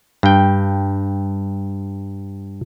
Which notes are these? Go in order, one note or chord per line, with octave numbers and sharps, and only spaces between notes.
G2 G5